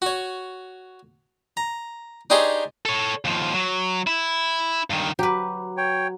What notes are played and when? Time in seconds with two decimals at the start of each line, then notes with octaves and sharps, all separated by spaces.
0.02 F#4 C#5
1.57 A#5
2.30 D4 D#4 G4 G#4 C5 C#5
2.85 A4 C#5
3.25 D#2 F3
3.54 F#3
4.07 E4
4.90 G2 D#3
5.19 F#3 G4 B4
5.77 C#5 G5